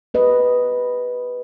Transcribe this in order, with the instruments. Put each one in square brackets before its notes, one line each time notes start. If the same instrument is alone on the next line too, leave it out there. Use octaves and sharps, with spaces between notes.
[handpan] G4 B4 D#5